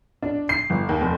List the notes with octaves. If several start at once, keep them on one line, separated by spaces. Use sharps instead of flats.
D4
C7
G1
D#2
F1